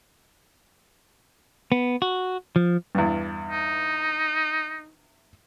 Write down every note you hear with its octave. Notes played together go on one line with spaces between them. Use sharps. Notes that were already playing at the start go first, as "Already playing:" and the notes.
B3
F#4
F3
E2 G2
D#4